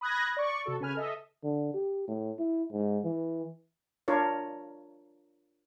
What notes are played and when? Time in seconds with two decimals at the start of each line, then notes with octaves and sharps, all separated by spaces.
0.01 B5 D#6 F#6 G#6 A#6
0.37 D5 C#6
0.65 C3 F#4 A4
0.80 C#3 B4 G#5 F6
0.95 A4 D#5 E5
1.44 D3
1.74 G4
2.08 A2
2.39 E4
2.72 G#2
3.04 E3
4.08 D4 F4 A#4 C#5